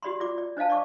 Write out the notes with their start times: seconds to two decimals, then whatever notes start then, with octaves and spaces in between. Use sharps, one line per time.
0.03 F#4 G4 D5 B5 C6
0.20 F4 D5 D6
0.38 D5
0.57 D4 C5 D#5 F5 A5
0.70 D5 D#5 C#6 D6